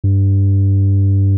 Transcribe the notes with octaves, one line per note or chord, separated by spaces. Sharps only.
G2